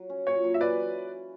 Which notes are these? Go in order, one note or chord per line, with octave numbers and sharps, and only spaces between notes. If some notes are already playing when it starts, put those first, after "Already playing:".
Already playing: F#3
C#4
A#2 C#5
F#3
E5
E3 B4 D5